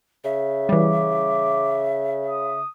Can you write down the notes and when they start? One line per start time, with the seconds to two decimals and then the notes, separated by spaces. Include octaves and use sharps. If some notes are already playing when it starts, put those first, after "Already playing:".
0.24 C#3 E5
0.69 E3 G3 D6
2.29 D#6